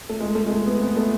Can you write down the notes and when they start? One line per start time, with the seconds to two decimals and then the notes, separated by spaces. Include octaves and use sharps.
0.09 A3
0.20 G#3
0.35 A3
0.47 G#3
0.51 A3
0.66 B3
0.81 B3
0.97 A3